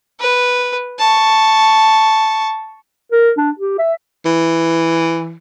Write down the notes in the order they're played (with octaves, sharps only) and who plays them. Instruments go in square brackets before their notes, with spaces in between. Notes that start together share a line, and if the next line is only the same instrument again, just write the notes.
[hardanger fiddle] B4
A5 C#6
[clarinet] A#4
D4
G4
E5
[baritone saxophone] E3